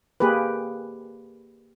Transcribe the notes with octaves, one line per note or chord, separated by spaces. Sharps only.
A#3 G4 G#4 B4